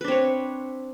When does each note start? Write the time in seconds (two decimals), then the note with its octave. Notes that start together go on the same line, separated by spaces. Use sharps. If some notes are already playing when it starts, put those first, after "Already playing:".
0.01 B4
0.04 D4
0.08 C4
0.11 C#5